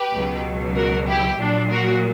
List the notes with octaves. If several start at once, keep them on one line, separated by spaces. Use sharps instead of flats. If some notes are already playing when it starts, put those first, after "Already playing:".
Already playing: G4 B4
C#2 B2 F#3
F#4 A#4
E4 G4
A#1 A#2 F#3 D4
F#4 A#4